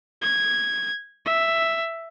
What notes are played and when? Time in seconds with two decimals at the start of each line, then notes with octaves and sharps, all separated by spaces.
0.22 G#6
1.26 E5